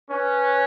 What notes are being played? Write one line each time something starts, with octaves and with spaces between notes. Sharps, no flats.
C#4 B4